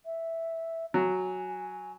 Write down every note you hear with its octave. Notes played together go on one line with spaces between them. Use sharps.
E5
F#3 G#5